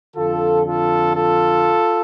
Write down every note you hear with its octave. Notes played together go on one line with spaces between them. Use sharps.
F2 D3 F4 A4
F4 A4
F4 A4